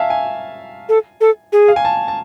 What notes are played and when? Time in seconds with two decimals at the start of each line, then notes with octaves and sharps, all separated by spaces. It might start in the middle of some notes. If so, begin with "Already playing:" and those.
Already playing: E5 F5 G#5 A5
0.10 G#5
0.89 A4
1.21 A4
1.52 G#4
1.68 F5
1.76 G#5
1.85 A5
2.08 A5